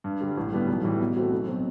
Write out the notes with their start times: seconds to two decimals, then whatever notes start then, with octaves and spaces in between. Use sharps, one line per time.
0.04 G2
0.20 D3 G3
0.37 A1
0.52 G2 D3 G3 B3
0.68 B1
0.84 A2 E3 G3
1.00 B2
1.16 A3 C4 F#4
1.32 B1
1.48 B2 F#3 C4